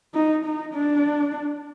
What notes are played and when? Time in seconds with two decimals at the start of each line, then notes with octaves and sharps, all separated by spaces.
0.14 D#4
0.45 D#4
0.74 D4